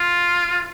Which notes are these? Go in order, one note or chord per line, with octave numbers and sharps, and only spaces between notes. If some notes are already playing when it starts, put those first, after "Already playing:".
Already playing: F4